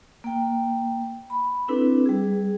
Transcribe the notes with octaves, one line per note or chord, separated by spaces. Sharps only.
A#3 G5
B5
C4 D4 E4 A4 B4
G3 G#4